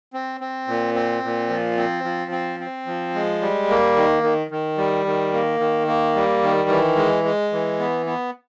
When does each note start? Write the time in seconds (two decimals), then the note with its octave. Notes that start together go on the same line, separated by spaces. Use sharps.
0.14 C4
0.41 C4
0.68 A#2
0.95 C4
1.23 A#2
1.49 F3
1.77 C4
2.04 F3
2.31 C4
2.60 C4
2.86 F3
3.15 G#3
3.41 G3
3.69 A#3
3.96 D#3
4.23 D#3
4.51 D#3
4.78 G3
5.06 D#3
5.33 A#3
5.60 D#3
5.87 A#3
6.15 G3
6.43 D#3
6.69 E3
6.97 G#3
7.24 G#3
7.52 E3
7.80 B3
8.06 B3